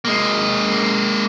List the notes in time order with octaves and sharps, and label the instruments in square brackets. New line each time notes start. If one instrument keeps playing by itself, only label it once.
[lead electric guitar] G#3 A#3